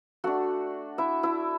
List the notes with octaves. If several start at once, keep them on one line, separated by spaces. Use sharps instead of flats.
A3 D4 F#4 F#5
E4 E5
E4 E5